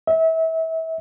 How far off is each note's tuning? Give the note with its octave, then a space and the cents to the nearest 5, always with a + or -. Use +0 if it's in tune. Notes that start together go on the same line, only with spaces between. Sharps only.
E5 -30